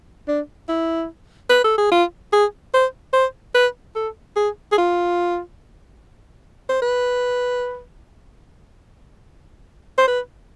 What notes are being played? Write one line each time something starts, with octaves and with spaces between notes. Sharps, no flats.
D4
E4
B4
A4
G#4
F4
G#4
C5
C5
B4
A4
G#4
G#4
F4
C5
B4
C5
B4